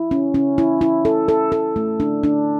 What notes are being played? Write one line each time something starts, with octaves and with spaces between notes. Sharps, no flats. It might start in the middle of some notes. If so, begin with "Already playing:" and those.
Already playing: E4
C#4
C#4
E4
E4
A4
A4
A4
A3
D4
D4